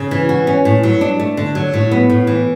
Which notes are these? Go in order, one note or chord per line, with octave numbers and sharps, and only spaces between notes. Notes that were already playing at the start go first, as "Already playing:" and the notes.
Already playing: C#3
E3
F#4
C#4
A2
F#3
D4
A3
D3
F#3
A2
B3
A2
E3